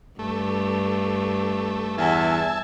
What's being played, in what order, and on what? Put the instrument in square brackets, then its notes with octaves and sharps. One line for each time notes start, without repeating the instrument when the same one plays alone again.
[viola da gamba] G2 [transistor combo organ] A3
[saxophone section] E2 [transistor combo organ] E5 G#5 A5